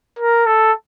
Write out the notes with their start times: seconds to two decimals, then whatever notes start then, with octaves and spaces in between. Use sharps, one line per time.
0.19 A#4
0.46 A4